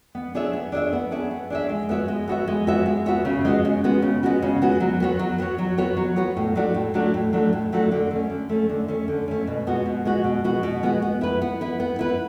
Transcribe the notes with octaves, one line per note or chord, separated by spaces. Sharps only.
B3
D4 G#4 C#5 E5
B3
D4 G#4 C#5 E5
B3
D4 G#4 C#5 E5
B3
D4 G#4 C#5 E5
G#3
B3 F#4 C#5 E5
G#3
B3 F#4 C#5 E5
G#3
B3 F#4 C#5 E5
G#3
B3 F#4 C#5 E5
C#3
G#3 B3 F#4
C#3
G#3 B3 F#4
C#3
G#3 B3 F#4
C#3
G#3 B3 F#4
F#3
B3 F#4 C#5
F#3
B3 F#4 C#5
F#3
B3 F#4 C#5
F#3
B3 F#4 C#5
A2
F#3 A3 D4 F#4
A2
F#3 A3 D4 F#4
A2
F#3 A3 D4 F#4
A2
F#3 A3 D4 F#4
D3
A3 C#4
D3
A3 C#4
D3
A3 C#4
D3
A3 C#4
B2
G#3 B3 F#4
B2
G#3 B3 F#4
B2
G#3 B3 F#4
B2
G#3 B3 F#4
B3
E4 B4
B3
E4 B4
B3
E4 B4